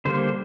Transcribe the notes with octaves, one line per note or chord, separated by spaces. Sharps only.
D3 G3 A#3 C5